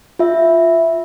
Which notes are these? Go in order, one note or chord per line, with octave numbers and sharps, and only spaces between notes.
F4 E5